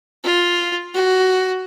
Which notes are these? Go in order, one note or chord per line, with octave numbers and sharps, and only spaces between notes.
F4
F#4